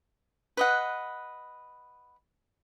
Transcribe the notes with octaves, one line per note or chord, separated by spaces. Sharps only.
B4 D#5 F#5